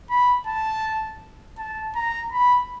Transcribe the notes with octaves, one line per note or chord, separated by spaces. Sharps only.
B5
A5
A5
A#5
B5